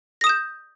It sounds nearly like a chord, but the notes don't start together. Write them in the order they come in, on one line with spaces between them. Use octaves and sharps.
A#6 D#6 E7 G6